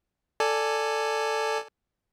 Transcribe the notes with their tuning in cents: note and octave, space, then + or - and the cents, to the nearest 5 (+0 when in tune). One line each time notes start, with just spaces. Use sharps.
A4 +10 D5 +0 G#5 +0